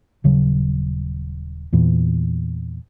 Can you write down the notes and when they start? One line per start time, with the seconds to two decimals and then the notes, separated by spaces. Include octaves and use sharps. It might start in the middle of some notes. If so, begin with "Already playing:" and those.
0.24 D#1 C#3 F#3
1.73 E2 A#2 E3